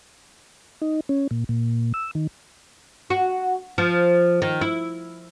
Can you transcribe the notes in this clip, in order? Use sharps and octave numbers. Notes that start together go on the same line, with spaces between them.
D#4
C#4
A#2
A#2
E6
D#3
F#4
F3
D#3
E4